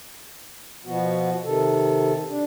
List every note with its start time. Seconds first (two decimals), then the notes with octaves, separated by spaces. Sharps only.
0.86 B2 F3 B3 F#4
1.44 C3 D#3 A4
2.29 D4